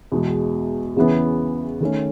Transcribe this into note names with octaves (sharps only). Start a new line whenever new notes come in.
E2 B2 G#3
E2 C#3 E3 B3
D#3 A3 C#4